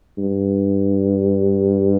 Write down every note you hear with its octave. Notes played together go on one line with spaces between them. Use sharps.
G2